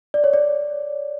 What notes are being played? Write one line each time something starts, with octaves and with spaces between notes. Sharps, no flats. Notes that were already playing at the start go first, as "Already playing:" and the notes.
D5
C#5
D5